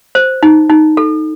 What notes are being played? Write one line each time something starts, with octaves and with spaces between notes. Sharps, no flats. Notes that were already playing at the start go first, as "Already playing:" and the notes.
C5
D#4
D#4
A4